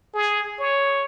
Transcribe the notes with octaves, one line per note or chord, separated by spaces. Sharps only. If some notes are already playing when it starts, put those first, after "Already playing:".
G#4
C#5